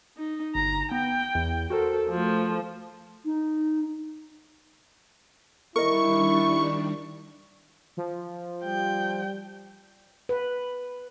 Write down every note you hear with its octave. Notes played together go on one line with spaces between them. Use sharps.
D#4
G1 A#5
B3 G5
E2
F#4 A4 A#4 C5
F3 A3
D#4
D#3 G3 D4 E4 A#4 D#5 C#6
F3
G3 G5
B4